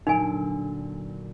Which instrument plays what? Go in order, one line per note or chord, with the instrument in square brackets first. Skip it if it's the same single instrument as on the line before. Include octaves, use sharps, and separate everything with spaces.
[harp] A#2 D3 F#3 [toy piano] D#4 G#5